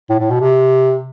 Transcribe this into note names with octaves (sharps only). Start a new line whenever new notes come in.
A2
A2
B2
C3